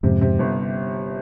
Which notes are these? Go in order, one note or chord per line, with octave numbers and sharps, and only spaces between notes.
F2 G#2 C3
C3
G1